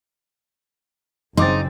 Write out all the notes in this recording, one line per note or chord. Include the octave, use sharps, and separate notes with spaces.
F#1 C#3 C4 D#4 C6 D6 A6